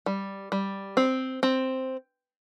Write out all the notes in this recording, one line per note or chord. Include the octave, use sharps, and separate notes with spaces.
G3
G3
C4
C4